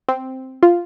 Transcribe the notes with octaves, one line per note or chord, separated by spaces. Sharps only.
C4
F4